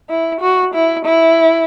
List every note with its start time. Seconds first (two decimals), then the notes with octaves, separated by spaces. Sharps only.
0.10 E4
0.41 F#4
0.75 E4
1.06 E4